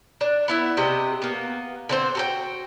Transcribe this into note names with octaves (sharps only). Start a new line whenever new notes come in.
D4
B3 E4 E5
C3 D4 G4 D#5
A#3 B3
D3 C4 C5
F#4 A4 G5